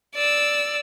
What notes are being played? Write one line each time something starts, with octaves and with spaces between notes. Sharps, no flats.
D5 E6